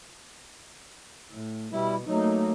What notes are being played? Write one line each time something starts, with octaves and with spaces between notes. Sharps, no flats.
A2
B2 G3 B3 E4
F#3 A3 A#3 D#4